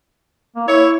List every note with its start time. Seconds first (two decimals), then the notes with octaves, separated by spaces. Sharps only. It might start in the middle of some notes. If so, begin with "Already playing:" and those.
0.56 A#3
0.68 E4 C#5